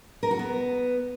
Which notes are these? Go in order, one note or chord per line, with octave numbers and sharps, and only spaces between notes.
A#4
F#4
B3